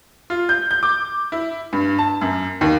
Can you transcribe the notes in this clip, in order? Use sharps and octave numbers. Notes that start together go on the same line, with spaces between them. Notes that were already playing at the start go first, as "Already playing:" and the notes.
F4
G6
G6
D6
E4
G2
A5
F#2
D#2